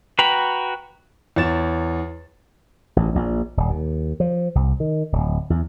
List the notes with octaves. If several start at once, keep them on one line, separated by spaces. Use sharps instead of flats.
F#4 B4 G5 A#5 B5
E2 C#5 A6 E7
A1
A#1
D#1
D#2
F3
C2
D#3
D1
E2